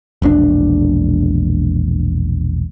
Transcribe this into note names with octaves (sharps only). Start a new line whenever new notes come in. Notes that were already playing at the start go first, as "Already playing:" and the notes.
E1 A#1 C4 D4